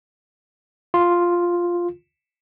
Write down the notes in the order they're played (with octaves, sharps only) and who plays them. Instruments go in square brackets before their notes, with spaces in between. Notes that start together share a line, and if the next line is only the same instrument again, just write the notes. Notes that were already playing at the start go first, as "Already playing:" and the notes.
[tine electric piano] F4